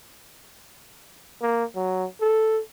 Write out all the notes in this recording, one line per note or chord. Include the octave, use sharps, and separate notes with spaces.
A#3
F#3
A4